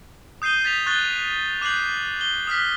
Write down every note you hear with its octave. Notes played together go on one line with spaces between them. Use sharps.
D#6 G6 C7 D#7 G7
A6 B6 F7
C#6 F#6 G6 A6 G7
D6 F#6 G6 C7 F#7
G7
D#6 F6 F#6 B6